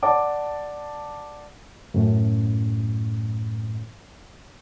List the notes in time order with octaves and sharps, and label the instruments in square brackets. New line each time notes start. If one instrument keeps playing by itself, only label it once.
[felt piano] D5 F#5 A5 D6
[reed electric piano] F#2 A2